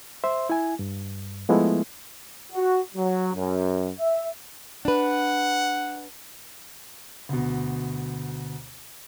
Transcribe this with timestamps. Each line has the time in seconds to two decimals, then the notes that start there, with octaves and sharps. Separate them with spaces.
0.24 C5 E5 C6
0.50 E4 G#5
0.79 G2
1.49 F3 G#3 A3 B3 E4
2.53 F#4
2.95 F#3
3.33 F#2
3.98 E5
4.85 D4 B4 F#5
7.29 D2 B2